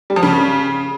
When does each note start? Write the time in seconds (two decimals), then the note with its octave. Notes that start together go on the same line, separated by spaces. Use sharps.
0.10 G3
0.16 F3
0.23 C#3